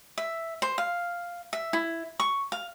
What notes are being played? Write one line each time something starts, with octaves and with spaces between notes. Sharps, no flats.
E5
C5
F5
E5
E4
C#6
F5